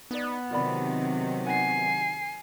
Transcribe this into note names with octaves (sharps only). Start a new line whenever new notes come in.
B3 D#4 D5
C3 D#3 F#3 F4 D5 B5
F#5 G#5 C7